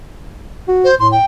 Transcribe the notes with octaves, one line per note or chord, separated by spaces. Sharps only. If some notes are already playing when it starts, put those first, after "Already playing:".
F#4
C5
A2 C6
G5